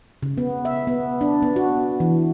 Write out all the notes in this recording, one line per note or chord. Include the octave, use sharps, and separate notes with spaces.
C#3
B3
E5
B3
D4
B3
F#4
E3